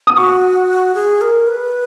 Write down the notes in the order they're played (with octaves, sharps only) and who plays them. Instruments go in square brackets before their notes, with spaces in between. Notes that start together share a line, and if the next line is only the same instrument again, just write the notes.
[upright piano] D#6
[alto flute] F#4 [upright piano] C#6
[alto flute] G#4
A#4
B4